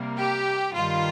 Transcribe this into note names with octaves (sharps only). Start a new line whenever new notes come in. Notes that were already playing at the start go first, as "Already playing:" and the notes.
Already playing: C3 G3 A#3
G4
G2 D#3 G3 F4